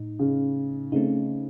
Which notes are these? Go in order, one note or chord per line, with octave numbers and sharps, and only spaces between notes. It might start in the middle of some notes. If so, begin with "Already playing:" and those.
Already playing: A2 D#4
C#3
C#3 A3 C4 D#4